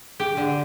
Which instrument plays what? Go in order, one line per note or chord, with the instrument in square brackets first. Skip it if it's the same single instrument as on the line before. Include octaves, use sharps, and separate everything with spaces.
[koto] G4 [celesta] G#4
[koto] D3